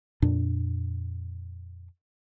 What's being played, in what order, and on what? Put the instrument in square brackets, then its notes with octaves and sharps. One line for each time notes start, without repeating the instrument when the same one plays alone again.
[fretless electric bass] F2 A#2 D4